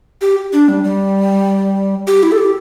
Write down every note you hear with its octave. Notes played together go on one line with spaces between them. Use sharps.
G4
D4
G3
G3
G4
E4
A4
G4